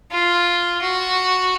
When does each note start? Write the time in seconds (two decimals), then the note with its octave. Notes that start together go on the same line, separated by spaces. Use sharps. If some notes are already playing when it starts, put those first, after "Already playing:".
0.12 F4
0.82 F#4